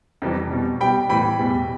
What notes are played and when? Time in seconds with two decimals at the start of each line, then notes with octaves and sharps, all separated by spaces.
0.22 F2 C3 E3 G3
0.51 B2 G3
0.81 B2 G3 G5 B5
1.09 A2 E3 G3 G5 B5
1.39 E2 B2 G3